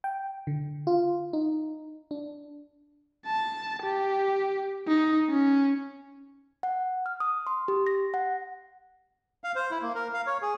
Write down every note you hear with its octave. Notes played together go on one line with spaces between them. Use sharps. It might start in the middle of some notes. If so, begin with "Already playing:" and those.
G5
D3
F4
D#4
D4
A5
G4
D#4
C#4
F#5
F6
D#6
C6
G4
A#6
F#5
F5
C5
E4
A#3
A#4
F5
C#5
G#4